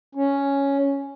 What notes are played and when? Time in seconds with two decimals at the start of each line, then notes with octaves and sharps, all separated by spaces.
0.15 C#4